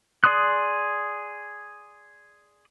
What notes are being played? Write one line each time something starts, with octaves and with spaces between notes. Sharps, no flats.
G#4 D5 C6 D#6 F#6